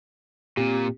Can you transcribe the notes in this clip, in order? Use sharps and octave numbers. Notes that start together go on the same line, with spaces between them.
A#2 C4 G4